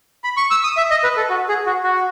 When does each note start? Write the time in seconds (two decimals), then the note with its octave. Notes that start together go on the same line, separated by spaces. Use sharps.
0.24 B5
0.37 C#6
0.51 E6
0.64 D#6
0.77 E5
0.91 D#5
1.04 B4
1.17 A4
1.30 F#4
1.48 G#4
1.66 F#4
1.83 F#4